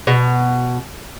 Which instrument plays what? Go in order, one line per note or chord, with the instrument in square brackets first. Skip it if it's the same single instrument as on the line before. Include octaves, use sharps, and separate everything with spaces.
[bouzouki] B2